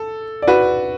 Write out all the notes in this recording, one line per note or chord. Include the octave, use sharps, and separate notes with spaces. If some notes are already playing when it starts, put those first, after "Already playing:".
Already playing: A4
D5
F#4 B4